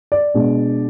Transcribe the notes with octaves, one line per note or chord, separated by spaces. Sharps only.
D5
B2 G#3 D4